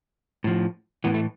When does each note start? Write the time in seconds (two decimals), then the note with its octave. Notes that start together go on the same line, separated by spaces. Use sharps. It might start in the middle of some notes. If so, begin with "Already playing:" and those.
0.44 A2 F3
1.04 A2 E3 B3
1.14 A3